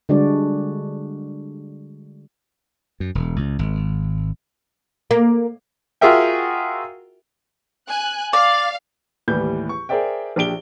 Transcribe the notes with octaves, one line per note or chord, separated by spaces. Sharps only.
D3 G3 G#3 D4 F#4 D5
F#2
E1
C#2
G#1
A#3
F4 F#4 G#4 A#4 E5 G5
G#5 F#6
D5 F5
D#2 A2 E3 G3 G6
C#6
G#4 A#4 C5 D5 E5 G5
A#1 D4 G4 D7 G7